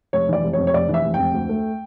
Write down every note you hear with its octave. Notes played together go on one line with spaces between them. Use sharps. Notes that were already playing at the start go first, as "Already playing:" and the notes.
F1 C#5
E3 D5
F1
C#5
F2
C#5
F1 D5
E3
E5
F1
F2 G5
D2
A3